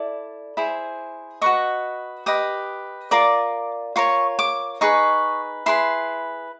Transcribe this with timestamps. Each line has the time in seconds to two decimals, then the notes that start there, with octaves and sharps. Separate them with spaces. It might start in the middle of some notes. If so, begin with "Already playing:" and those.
Already playing: E4 A4 D5
0.57 E4 G#4 C5
1.41 F#4 B4 D#5 C#6
2.26 G4 B4 D#5 D#6
3.11 F4 A#4 D5 D6
3.96 F4 A#4 C#5 C#6
4.39 D6
4.81 D#4 G#4 B4 C#6
5.66 E4 G#4 B4 C6